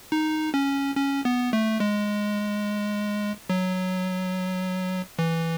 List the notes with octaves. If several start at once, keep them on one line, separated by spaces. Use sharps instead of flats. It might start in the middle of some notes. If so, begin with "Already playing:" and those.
D#4
C#4
C#4
B3
A3
G#3
F#3
E3